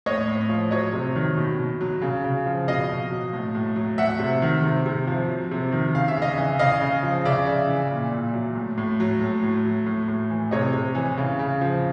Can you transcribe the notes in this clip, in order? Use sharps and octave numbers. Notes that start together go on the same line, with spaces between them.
A2 C#5 D#5
A2
F3
F#3 C#5 D#5
C3
D#3
B2
B2
F#3
C#3
C#3
F3
B2 D#5 F5
B2
F#3
A2
A2
F#3
F#3 E5 F#5
C3
D#3
C3
C3
F3
F#3
C3
D#3
C#3 F5
E5
C#3
D#5 F5
E3
C#3 D#5 F5
C#3
F3
C#3 D5 E5
C#3
E3
A#2
A#2
F#3
A2
A2
F#3
A2
A2
F#3
A2
A2
E3
C3 C#5 D#5
C3
E3
C#3
C#3
F3